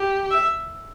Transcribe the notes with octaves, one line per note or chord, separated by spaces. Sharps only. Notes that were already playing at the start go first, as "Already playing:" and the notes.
Already playing: G4
E5